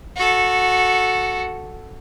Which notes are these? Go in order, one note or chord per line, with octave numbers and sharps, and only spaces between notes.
F#4 A4